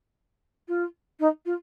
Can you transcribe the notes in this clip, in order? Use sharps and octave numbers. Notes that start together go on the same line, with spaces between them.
F4
D#4
F4